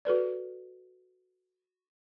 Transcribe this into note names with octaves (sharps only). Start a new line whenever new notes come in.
F#4 A4 B4 D5